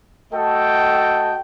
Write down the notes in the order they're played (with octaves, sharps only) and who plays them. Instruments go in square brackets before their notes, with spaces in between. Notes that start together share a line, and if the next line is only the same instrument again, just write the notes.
[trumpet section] A3 F#4 A4 D#5 G5